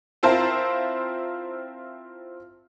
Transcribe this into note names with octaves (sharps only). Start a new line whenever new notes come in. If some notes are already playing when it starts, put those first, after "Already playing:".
C4 E4 F4 A#4 C5 A5